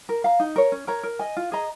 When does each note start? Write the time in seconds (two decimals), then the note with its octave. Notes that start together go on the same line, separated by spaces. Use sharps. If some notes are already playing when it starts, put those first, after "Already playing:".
0.09 A#4
0.24 F5 A#5
0.40 D#4
0.56 A#4 C#5
0.72 C#4
0.87 A#4 C#5 A#5
1.03 A#4
1.19 D#5 G#5
1.37 F4
1.52 G#4 D#5 A#5